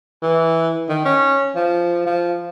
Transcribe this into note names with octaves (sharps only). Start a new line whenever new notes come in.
E3
D#3
C#4
F3
F3